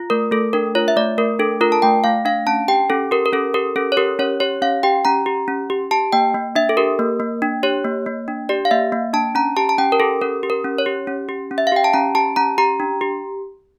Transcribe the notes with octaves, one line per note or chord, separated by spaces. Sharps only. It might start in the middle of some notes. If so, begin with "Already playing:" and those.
Already playing: F4
A3 A#4
A3 A4
D4 A#4
F4 C#5
E5
A3 D5
A3 A#4
D4 A4
F4 A#4
A5
A3 G5
A3 F5
D4 F5
C#4 A5
G4 G5
C#4 A4
G4 A#4
A#4
C#4 A4
G4 A#4
C#4 A4
C#5
G4 A#4
C#4 C#5
G4 C#5
C#4 F5
G4 G5
C#4 A#5
G4
C#4
G4
G4 A5
A#3 G5
A#3
D4 E5
A4
G4 A#4
A#3
A#3
D4
G4 C#5
A#3
A#3
D4
G4 D5
F5
A#3 E5
A#3
D4 A5
C#4 A#5
G4 A5
A5
C#4 G5
A#4
G4 A4
C#4 A#4
G4
A#4
C#4
C#5
G4
C#4
G4
C#4
E5
F5
G4 G5
A5
C#4 A#5
G4 A5
C#4 A#5
G4 A#5
D4
G4